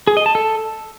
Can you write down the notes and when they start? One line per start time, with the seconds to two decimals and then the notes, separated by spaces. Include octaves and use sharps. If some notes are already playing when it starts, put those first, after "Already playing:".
0.07 G#4
0.17 D#5
0.26 A5
0.35 A4